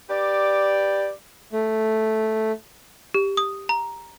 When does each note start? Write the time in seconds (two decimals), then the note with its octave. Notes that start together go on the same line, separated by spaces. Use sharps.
0.10 G4 B4 D5
1.53 A3
3.14 G4
3.37 D#6
3.69 A#5